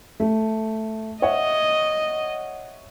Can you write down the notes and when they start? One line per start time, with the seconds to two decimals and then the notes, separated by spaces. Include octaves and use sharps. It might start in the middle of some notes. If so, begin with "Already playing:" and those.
0.20 A3
1.22 C#5 D#5 E5 F#5